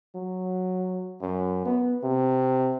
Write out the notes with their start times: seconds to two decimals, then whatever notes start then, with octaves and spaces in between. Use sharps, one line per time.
0.15 F#3
1.21 F#2
1.66 B3
2.04 C3